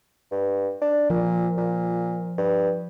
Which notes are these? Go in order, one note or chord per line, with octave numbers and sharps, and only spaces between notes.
G2
D4
A#2 F3
A#2
G2